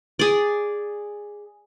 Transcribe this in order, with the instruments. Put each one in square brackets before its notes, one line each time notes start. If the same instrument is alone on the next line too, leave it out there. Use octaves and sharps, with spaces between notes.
[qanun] G#4 D5